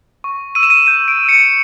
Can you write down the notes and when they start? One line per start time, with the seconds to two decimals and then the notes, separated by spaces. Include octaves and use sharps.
0.24 C#6
0.55 E6 D#7
0.63 E7
0.70 D#7
0.87 G6 D#7
1.08 D7
1.18 E6
1.29 C#7